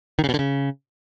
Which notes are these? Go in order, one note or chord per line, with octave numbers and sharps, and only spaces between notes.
D#3
C#3
B2
D3
C#3